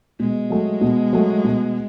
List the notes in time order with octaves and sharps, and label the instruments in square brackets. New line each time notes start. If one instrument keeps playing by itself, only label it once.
[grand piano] B2 [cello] G#3
[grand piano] F#3 A3
B2
F#3 A3
B2